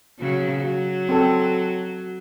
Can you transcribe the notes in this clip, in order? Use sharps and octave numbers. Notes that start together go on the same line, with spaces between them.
C#3 F#3
F#3
C4 A4